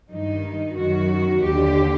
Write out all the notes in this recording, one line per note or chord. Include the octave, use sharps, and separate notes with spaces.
G2 D#3 D#4
F#2 D#3 F#4
D#2 D3 G4